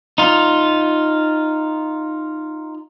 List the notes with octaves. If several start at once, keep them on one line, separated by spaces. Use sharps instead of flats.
D#4 F4